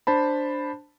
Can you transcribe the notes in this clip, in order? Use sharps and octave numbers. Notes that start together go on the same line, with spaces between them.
D4 C5 A5 B5